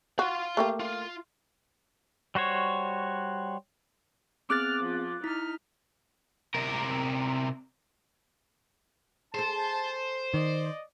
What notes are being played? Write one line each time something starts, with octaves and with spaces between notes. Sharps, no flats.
F#4 F5 C6
A3 A#3 G4
F4
G3 F#4 C5 C#5
B3 C4 G#4 D6 F6 F#6 A6
F3
D#4 E4 F6 B6
C3 A#4
G#4 A4 C5 A5
D#3 D5 D#5